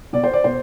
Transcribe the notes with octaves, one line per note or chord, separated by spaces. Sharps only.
B2 D5
C5
D5
B2 C5